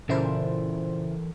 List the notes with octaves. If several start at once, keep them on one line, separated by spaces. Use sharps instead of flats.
A#2 C#3 E3 E4 A4 A#4 C5